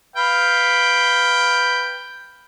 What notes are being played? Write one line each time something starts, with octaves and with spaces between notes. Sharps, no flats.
B4 F5 G5